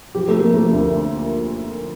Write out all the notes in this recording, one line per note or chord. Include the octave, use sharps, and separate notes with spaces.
F3 G4
A3
F3
A#3
F3 A3
D2